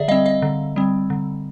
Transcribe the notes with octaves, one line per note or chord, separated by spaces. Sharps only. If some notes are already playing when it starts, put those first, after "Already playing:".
Already playing: D3 G#4 D5 E5
G3 C4 D#5 F5
D#5 F5
D3
G3 C4
D3